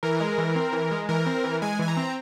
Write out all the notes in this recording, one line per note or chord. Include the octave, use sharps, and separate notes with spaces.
E3 A#4
G#3
E3
C4
E3
G#3
E3 A#4
C4
E3
G#3 G#5
E3 G#5
A#5
C4